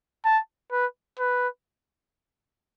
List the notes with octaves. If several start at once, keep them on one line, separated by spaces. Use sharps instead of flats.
A5
B4
B4